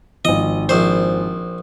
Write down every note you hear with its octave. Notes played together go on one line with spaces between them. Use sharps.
G#1 F3 D#5
A#1 C5